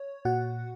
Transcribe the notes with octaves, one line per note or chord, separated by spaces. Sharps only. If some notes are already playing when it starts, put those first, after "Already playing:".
Already playing: C#5
A#2 F#4 F#5